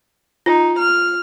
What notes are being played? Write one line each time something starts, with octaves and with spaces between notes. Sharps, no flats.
D#4 F4
F6